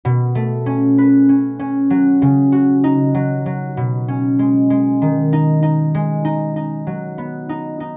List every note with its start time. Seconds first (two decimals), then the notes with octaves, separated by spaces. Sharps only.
0.05 B2
0.35 A3
0.66 C#4
0.98 B4
1.29 C#4
1.59 C#4
1.90 F#3
2.22 C#3
2.52 F#4
2.84 D#4
3.15 F#3
3.46 F#3
3.77 B2
4.08 C#4
4.39 G#3
4.70 G#3
5.02 D#3
5.33 D#4
5.63 D#4
5.94 G#3
6.25 D#4
6.56 D#4
6.87 F#3
7.18 B3
7.49 D#4
7.80 D#4